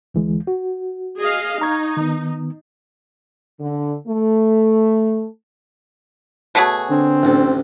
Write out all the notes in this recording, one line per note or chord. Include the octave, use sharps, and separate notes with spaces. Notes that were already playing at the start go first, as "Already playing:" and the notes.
D2 E3 G#3
F#4
G#4 D#5 F5
D#4 A#5 C#6 G#6
D#3 B3
D3
A3
B2 A3 F#4 G#4 C#5
D3 C4
A1 D2 A4